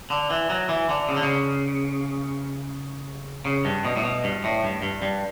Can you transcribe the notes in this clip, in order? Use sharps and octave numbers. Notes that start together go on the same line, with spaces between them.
D3
E3
F#3
E3
D3
C#3
D3
C#3
C#3
G2
B2
A2
B2
G2
A2
G2
G2
G2